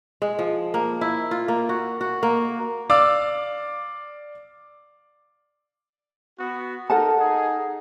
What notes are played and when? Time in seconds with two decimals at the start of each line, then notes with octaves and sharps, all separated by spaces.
0.22 G#3
0.39 F3
0.74 A#3
1.01 E4
1.31 F4
1.48 A#3
1.69 F#4
2.01 F#4
2.23 A#3
2.90 D5 F5 D6 E6
6.39 B3 F#4
6.90 D#4 A4 A#4 F#5 A5
7.19 D#4 G#4